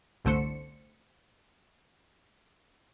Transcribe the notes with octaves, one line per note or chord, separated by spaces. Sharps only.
G1 C2 D3 A3 C5 C#7